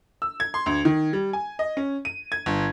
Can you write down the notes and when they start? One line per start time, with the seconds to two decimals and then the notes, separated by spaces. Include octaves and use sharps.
0.22 E6
0.40 G#6
0.54 C6
0.66 D2
0.85 D#3
1.13 G3
1.33 G#5
1.59 D#5
1.77 C#4
2.05 D#7
2.32 G#6
2.46 G1